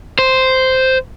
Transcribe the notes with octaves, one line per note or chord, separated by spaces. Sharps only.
C5